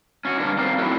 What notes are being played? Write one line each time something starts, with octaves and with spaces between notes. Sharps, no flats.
C#4 F4 F#4
G2 D3 A#3 C#4 D4
C4 D#4 A#4 C5 D5 F5
F#3 A3 C4 E4